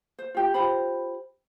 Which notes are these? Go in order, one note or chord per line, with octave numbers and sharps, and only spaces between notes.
C5
F4 G4
F4 G4 C5 B5